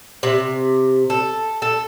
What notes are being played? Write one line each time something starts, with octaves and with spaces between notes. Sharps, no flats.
C3
A4
A4